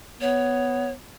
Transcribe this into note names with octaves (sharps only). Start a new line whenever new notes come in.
B3 C#5